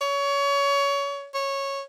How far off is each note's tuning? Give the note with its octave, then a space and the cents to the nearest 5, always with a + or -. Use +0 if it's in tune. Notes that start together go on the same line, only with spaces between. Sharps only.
C#5 +25
C#5 -10